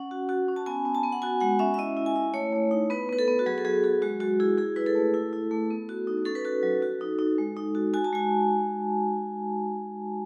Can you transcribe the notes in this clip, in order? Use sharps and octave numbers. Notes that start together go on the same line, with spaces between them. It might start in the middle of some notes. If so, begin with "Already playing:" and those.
Already playing: C#4 F#5
F#4
F#4
C#4
A5
B3 G#5
B3
A5
B3
F#5
F#4 G#5
G#3 F#5
C#4 E5
E5
E4 D#5
E4
G#5
E4
A3 C#5
A3
D#4
B3 B4
B3 B4
A4
B3
F#4
F#3 G#4
A4
F#3 G#4
F#4 G#4
G#3 F#4
G#3 F#4
E4 G#4
E4 G#4
E4 B4
A4
A3
E4
E4
A3
B3
F#4
D#4
C#4 A4
B4
F#4 A4
F#3
F#4
D#4
D#4
G#3
D#4
F#4
F#4 G#5
A5
G#3 G#5